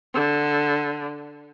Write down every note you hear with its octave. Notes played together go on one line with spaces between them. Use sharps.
D3